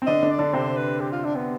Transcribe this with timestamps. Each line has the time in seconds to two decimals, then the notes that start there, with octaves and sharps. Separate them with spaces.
0.02 C4
0.06 D3 D4 D#5
0.23 D3 D4
0.31 D5
0.39 D3 D4
0.53 C3 C4 C5
0.77 B4
1.00 G4
1.12 F4
1.25 D4
1.36 B3